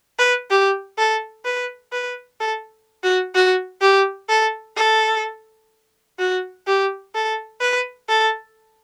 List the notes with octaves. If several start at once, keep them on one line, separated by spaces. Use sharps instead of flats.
B4
G4
A4
B4
B4
A4
F#4
F#4
G4
A4
A4
F#4
G4
A4
B4
A4